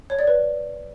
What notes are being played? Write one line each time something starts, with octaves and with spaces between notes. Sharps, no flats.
C#5
D5
B4